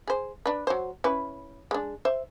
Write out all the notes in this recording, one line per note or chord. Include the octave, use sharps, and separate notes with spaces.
G#4 C5
D4 B4
F#3 C5
C#4 E4 B4
G#3 D4
C5 E5